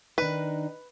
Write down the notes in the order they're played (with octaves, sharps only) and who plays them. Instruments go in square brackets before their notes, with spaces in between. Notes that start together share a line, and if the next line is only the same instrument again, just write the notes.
[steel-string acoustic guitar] D#3 D4 D#4 [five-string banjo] B4